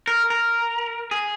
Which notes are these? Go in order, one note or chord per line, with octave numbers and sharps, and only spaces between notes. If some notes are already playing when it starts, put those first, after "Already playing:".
A#4
A#4
G#4